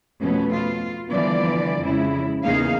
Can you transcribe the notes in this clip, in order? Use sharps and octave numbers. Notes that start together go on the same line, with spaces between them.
F2 B2 A3 B3 C#4
F4
D3 E3 F3 G3 B3 D5
F2 C#3 G#3 C#4 E4
E2 C#3 A#3 D#4 G#4 F5